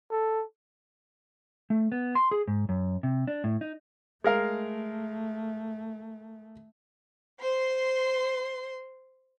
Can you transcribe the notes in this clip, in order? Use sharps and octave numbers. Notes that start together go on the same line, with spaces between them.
A4
A3
B3
C6
G#4
G#2
F#2
C3
D4
A2
D#4
G#3 A3 A#4 F5
C5 C6